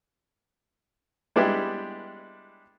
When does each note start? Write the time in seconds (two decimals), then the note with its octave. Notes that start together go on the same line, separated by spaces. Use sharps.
1.36 G3 G#3 B3 D4 E4 G4